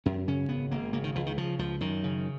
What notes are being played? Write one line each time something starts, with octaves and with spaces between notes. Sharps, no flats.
F#2 C#4
C#3 C#4
G#1 B3
G#1 A#3
C#3 A#3
D#3
C#2 F3
D#3
C#3 F3
C#2 F3
F#2 D#3
C#3